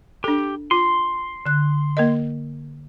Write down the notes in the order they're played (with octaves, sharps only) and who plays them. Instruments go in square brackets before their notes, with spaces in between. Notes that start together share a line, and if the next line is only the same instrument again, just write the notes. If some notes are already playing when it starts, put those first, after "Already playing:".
[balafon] D4 A4 [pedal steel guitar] G4
[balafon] F4 [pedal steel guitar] C6
[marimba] D3 F#6
[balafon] A#3 A#4 D#5